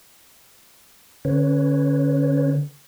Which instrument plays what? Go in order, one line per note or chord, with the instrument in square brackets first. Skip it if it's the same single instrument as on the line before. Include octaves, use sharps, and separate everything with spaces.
[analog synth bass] D3 [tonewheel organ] C#4 B4 C#5